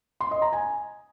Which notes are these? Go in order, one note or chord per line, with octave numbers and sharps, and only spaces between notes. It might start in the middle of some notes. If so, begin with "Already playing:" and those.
C6
D#5
A#5
G#5